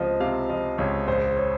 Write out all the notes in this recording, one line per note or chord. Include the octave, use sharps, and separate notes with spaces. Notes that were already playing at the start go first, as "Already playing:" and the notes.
Already playing: C#2 C3 F3 D#5
C3 F5
F3 D#5
C#2 C#5
A#1 C5
C#5